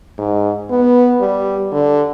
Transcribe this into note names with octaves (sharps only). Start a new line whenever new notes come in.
G#2
B3
G3
D3